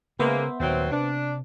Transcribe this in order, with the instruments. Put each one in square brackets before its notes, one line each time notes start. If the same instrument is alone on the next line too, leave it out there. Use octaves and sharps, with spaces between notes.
[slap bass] C#3 [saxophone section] G#3 A#3 [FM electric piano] B3 C5 E5
[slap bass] D#2 A#2 [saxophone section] D#3 F#3 C4
[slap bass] C3 [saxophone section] D4